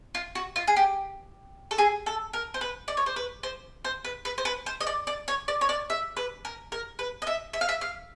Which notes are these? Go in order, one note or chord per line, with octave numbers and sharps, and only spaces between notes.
F4
F#4
F4
G#4
G4
A4
G#4
A4
A#4
C5
B4
D5
C#5
C5
B4
C5
C5
B4
B4
C5
B4
C5
D#5
D5
D5
C#5
D5
C#5
D5
E5
B4
A#4
A#4
B4
D#5
E5
E5
F5
E5
F5